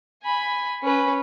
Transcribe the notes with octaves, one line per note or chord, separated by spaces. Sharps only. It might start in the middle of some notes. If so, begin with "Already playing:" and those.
G#5 B5
C#4 B4